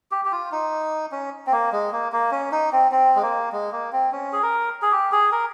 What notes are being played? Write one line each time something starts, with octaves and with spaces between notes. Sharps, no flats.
G4
G4
F4
D#4
C#4
C4
A#3
G#3
A#3
A#3
C#4
D#4
C4
C4
G#3
A#3
G#3
A#3
C4
C#4
G#4
A#4
G#4
G4
G#4
A#4